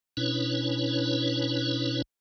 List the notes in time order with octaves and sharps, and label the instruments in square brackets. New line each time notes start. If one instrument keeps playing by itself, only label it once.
[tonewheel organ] B2 C#4 D4 E4 B4 C#5